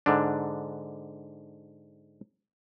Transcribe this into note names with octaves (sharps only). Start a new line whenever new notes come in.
G#2 D3 D4